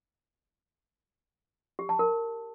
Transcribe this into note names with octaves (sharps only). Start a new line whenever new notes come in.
G4
A5
A#4